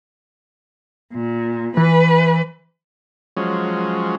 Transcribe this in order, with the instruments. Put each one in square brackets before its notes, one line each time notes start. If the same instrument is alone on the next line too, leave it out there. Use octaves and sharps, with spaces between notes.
[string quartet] A#2
[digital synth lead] E3 [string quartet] B4
[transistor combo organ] F3 F#3 G#3 C#4